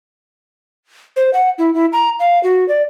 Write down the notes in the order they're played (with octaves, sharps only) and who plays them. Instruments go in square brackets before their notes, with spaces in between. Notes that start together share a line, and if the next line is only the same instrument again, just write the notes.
[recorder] C5
F#5
E4
E4
A#5
F5
F#4
D5